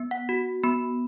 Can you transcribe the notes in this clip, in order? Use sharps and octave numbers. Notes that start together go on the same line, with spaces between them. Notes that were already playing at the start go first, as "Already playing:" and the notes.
Already playing: B3
F#5
F#4
B3 B5